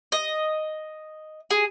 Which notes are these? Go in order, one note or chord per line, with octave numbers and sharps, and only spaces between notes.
D#5
G#4